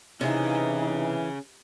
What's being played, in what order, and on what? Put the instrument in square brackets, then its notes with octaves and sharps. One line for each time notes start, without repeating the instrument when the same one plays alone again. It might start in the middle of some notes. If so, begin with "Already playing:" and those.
[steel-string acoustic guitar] C3 [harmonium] E3 [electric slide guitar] C#4 G#4 [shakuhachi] D#4